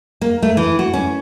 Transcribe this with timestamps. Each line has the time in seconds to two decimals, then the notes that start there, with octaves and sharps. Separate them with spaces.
0.21 A#3
0.42 A3
0.57 E3
0.79 F#4
0.94 C#4